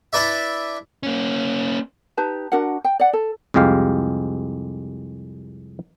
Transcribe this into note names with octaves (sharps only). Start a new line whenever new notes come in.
D4 E4 B4 D5 E5
A#3 C#4
D#4 G4 B4 A5
D4 F#4 A#4 F#5
G5
D5 F#5
A4
C2 F2 G#3 G4 F5